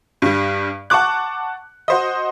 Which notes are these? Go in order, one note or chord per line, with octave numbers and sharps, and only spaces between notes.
G2 G3
F#5 A5 C#6 D6 F#6
F#4 C5 D#5